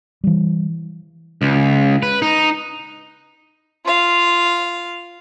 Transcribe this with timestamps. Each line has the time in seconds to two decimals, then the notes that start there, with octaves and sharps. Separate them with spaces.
0.24 E3 G3
1.42 C#2
2.03 B4
2.22 D#4
3.85 F4 F5